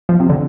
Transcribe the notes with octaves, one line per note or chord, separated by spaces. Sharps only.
F3
C3
D3